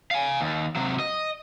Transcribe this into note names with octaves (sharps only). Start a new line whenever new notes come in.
F5 G#5
D#2
C3 F#3
D#5